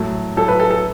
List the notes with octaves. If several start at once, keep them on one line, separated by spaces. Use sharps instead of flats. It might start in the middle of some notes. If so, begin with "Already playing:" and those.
Already playing: A2 F#3 A3
A2 F#3 A3 A4
B4
A4
A4